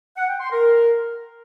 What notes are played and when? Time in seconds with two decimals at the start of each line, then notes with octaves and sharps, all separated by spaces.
0.17 F#5
0.28 G5
0.40 C6
0.52 A#4